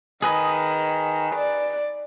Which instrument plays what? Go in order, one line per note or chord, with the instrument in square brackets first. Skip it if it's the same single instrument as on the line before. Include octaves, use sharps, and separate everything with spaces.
[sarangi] D#3 [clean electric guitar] G#4 B4 D#5
[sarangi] D5